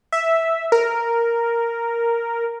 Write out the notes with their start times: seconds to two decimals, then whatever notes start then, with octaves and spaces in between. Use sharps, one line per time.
0.12 E5
0.72 A#4